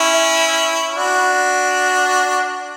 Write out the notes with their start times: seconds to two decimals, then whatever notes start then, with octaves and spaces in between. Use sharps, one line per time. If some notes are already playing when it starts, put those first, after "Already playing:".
Already playing: C#4 E4
0.95 D4 F#4